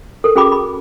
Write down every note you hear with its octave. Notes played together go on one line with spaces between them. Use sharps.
A4 A#4
C#4 F#4 G#4 G5 B5 D6
B5